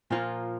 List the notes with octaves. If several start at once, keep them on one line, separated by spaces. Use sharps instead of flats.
A#2 F3 A#3 F4